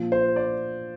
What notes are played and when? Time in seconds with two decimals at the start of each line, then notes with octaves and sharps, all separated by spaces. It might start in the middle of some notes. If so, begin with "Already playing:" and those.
Already playing: A#2 F3
0.12 C5
0.36 D5